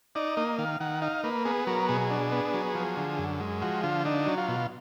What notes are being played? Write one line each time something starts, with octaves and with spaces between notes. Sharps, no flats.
D#4 D5
A#3 D#5
D#3 F5
D#3 F#5
D#4 F5
A#3 B4
B3 G#4
F#3 A#4
B2 G#4
D4
B3
F#3
F3
D3
F#2
G#3
F3 F#4
D3 F4
D4 D#4
F#3
F4
B2